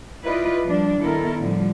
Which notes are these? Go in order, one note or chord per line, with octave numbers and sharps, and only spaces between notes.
E4 F4 B4 D5 D#5
F3 G3 D4
D#3 B3 E4 A4 A#4
A2 D3 F3 G3